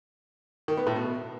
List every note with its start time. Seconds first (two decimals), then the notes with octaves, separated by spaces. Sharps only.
0.68 D#3
0.77 B3
0.87 A2
0.96 B2